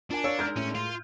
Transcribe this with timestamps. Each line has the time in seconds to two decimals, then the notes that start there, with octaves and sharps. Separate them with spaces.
0.10 D4 F4 A#4 G#5
0.24 A#4 C#5 F5 E6
0.39 G#3 A#4 F6 G6 G#6
0.57 A2 C#4
0.75 F4